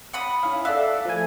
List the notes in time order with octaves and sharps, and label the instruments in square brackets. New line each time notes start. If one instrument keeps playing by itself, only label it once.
[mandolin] F#5 B5 D#6
[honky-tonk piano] C#4 E4 [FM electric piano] F5
[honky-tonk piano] A4 D5 F#6 [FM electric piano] E5 [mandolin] F5
[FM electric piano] F3 A3 G#5